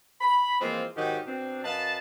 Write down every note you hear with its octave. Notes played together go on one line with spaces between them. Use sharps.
B5
E3 F3 G#3 A#3 C4 F4
G#2 D#3 F#3 D#4 F#4 G4
B2 C4 D4
F#2 B4 D#5 F5 A5